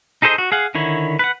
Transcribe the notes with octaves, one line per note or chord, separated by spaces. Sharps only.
D#4 G#4 A4 C5 D#5
F#4
G#4 F5 F#5
D3 D#3 E4 C#5
B4 F#5